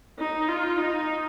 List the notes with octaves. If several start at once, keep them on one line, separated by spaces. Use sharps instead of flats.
D#4
F4
D#4